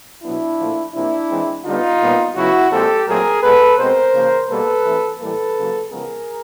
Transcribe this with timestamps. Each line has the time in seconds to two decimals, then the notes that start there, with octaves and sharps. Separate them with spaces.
0.23 B2 F#3 B3 D4 E4
0.59 A#2 F3 A3
0.94 C3 F3 A#3 D4 E4
1.30 E3 G#3 C4
1.64 D3 G3 B3 D#4 F4
2.01 A#2 G3 B3
2.35 C#3 F#3 B3 E4 F#4
2.71 A#2 F3 G#3 C4 G4 A4
3.07 A#2 F#3 A3 C4 G#4 A#4
3.42 B2 G#3 B3 A4 B4
3.78 B2 G#3 C4 A#4 C5
4.13 C#3 F3 A#3
4.49 B2 G3 A#3 A4 B4
4.84 E3 A3 C4
5.20 A2 E3 G3 A#3 A4 B4
5.56 C#3 F#3 A#3
5.91 C#3 F3 G#3 B3 G#4 A#4